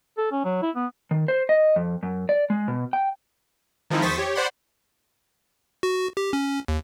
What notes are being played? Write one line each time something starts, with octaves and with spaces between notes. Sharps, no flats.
A4
C#4
F#3
E4
B3
D#3
C5
D#5
F2
F#2
D5
G#3
B2
G5
D#3 F3 G#3 C4 D#4 E4
E2 C5 C#6 D#6 A6 B6
G4 C#5
C5 D5 F#5 B5 C6
F#4
G4
C#4
D#2